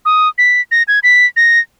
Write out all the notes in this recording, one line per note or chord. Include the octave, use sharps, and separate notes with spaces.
D#6
B6
A#6
G#6
B6
A#6